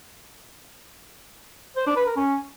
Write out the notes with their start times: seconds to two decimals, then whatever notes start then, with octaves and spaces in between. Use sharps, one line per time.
1.76 C5
1.86 D4
1.96 B4
2.06 A#4
2.16 C#4